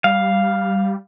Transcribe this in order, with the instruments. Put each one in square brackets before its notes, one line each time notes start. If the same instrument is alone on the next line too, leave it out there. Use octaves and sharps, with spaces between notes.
[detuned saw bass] G3 [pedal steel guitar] F5